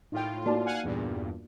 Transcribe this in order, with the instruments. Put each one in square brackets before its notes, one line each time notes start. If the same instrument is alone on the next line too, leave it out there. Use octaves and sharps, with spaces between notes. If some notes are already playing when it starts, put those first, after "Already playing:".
[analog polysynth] A2 F4 [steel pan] D#4 G5
[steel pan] A#3 D5 A5 [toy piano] D#4 F#4
[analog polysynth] F5 F#5 G#5
E2 G2 A#2